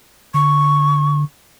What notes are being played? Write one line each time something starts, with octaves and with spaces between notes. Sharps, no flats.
D3 C#6